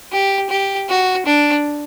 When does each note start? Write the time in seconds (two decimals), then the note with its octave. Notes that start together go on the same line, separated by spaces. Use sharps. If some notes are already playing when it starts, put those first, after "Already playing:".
0.12 G4
0.50 G4
0.89 F#4
1.26 D4